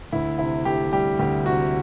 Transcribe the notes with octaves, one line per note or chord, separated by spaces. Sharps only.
D2 E4
C3 E4
D2 G4
G3 G4
D2 G4
C3 F#4